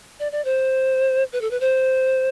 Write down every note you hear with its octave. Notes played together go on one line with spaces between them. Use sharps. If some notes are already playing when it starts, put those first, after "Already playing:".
D5
D5
C5
B4
A4
B4
C5